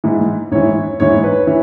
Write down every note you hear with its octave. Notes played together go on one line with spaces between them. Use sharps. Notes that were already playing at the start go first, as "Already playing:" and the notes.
G#2 E3
G#2 E3 C#5
G#2 E3 C#5
B4
E3 C#5